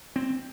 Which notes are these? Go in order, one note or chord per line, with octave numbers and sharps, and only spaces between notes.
C4